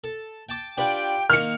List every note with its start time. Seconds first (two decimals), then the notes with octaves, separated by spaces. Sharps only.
0.04 A4
0.49 G5 A5 D6
0.78 D4 F4 G4 B4 F#5 G5
1.30 D#3 A#3 D#4 F6 C#7